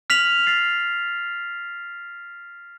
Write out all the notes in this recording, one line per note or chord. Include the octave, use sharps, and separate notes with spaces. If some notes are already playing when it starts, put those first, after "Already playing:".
F6 B6 F7 F#7
A6 C7